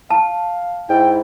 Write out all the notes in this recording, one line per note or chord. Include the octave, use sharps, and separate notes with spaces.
F5 A5
G#2 E4 G5